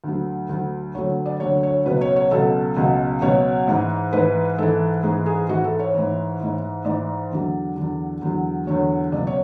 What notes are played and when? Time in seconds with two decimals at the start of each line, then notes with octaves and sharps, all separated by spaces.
0.04 D2 D3 F#3
0.49 D2 D3 F#3
0.95 D2 D3 F#3 C#5
1.26 D5
1.40 D2 D3 F#3 C#5
1.63 C#5
1.86 C#2 B2 F#3 B4
2.01 C#5
2.16 C#5
2.31 C#2 B2 F#3 A4
2.77 C#2 B2 F#3
3.22 C#2 B2 F#3 C#5
3.68 G#2 E3
4.13 G#2 E3 B4
4.58 G#2 E3 A4
5.04 G#2 E3 G#4
5.26 G#4
5.49 G#2 E3 F#4
5.64 A4
5.80 C#5
5.94 G#2 E3
6.40 G#2 E3
6.85 G#2 E3 D5
7.31 E2 D3 F#3
7.76 E2 D3 F#3
8.22 E2 D3 F#3
8.67 E2 D3 F#3 C#5
9.12 C#2 B2 F#3 D5
9.27 C#5